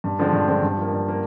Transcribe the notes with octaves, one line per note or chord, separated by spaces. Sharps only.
G2
D3 F3 G#3 C4
G2
D3 F3 G#3 C4
G2
F3 A#3
G2
F3 A#3